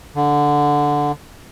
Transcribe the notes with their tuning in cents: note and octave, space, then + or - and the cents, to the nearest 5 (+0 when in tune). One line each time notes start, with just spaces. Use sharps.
D3 -5